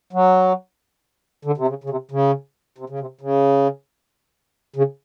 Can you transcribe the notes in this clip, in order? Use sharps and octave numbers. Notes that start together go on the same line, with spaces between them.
F#3
D3
C3
C#3
C#3
C3
C#3
C3
C#3
C3
C#3
C#3